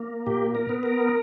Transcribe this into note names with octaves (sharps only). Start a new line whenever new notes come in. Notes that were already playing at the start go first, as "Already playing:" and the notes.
Already playing: A#3
A#2 G4
A#4
B3
A#4